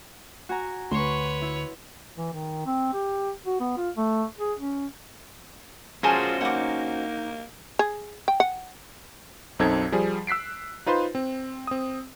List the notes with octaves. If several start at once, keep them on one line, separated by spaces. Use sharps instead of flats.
F#4 G#5 A#5
D2 B4 C#5 C6 C#6
E4
E3
D#3
C4
G4
F#4
B3
F4
A3
G#4
C#4
C#4 F4 F#4 G#4 A#4 C5 G#5 A5
A#3 D#4 F#5 D6
G#4
G5
F#5
B1 F#2 C4 D#4 A4 G#6
F3 G3 G#4
E6 F#6 B6 C7 D7
D#4 F4 B4 C5 C6
C4
C4 D#6